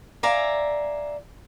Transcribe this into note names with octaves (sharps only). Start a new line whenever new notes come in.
D5 E5 F5 G#5 A#5